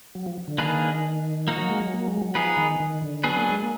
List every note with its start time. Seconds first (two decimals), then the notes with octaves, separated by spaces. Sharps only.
0.15 F#3
0.26 F3
0.48 D3
0.58 D#3 A#3 D4 G#4 B4
1.47 F3 A#3 D#4 F#4
1.58 F#3
1.69 G#3
1.80 F#3
1.94 A#3
2.08 G#3
2.21 F#3
2.35 F3 B3 D#4 G#4 B4
2.57 D#3
2.80 D#3
3.02 D3
3.24 F#3 B3 D4 G#4 B4
3.37 A#3
3.49 G#3
3.62 A#3